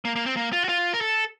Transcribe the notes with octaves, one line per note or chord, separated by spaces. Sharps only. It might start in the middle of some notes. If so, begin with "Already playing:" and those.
A#3
A#3
C4
A#3
F4
F#4
F4
A#4
A4